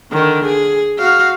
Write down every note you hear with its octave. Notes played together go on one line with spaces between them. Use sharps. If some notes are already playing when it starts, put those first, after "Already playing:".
D3 D#3
G#4
F#4 F5